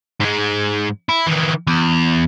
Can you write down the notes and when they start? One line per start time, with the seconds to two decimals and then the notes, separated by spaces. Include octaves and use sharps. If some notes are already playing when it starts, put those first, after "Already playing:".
0.20 G#2 G#3
1.09 E4
1.27 D#3 E3
1.67 E2